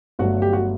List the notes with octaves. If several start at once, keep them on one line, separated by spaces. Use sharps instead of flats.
G1 G2 F#3 A3 F#4
G4
F#4